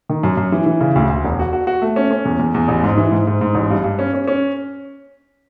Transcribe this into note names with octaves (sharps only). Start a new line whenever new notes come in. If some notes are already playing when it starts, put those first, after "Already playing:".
D#3
F#2
F#2
E3
E3
C#3
D2
D2
E1
F#4
F#4
F#4
A3
C#4
C#4
E2
E2
E2
A1
G#2
E3
G#2
G#2
G#2
A1
G2
G2
C#4
C#4
C#4